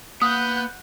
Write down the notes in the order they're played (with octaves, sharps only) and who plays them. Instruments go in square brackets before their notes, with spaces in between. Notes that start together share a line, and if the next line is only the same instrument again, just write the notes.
[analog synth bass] A#3 [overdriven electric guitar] B3 [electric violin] F#5 G6 [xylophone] D#6